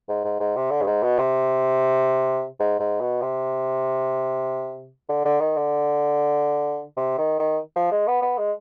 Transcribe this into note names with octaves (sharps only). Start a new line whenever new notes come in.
G#2
G#2
G#2
C3
D3
G2
G#2
B2
C3
G#2
G#2
B2
C3
D3
D3
D#3
D3
C3
D#3
D#3
F3
G#3
B3
B3
G#3